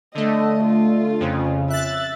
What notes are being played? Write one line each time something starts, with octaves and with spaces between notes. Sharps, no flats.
D3 A3 D#5
F4
F2 C#3
E5 F#6 A6